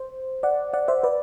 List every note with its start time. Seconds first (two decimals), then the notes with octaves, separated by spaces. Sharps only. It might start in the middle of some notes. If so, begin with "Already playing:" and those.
Already playing: C5
0.43 D5 F#5
0.73 D5 F#5
0.88 C5 E5
1.03 B4 D5